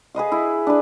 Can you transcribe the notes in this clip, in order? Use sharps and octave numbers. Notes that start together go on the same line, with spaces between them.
G#4 B4 D#5 F5
E4
D4 B4